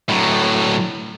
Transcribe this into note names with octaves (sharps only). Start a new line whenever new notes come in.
A2 F#3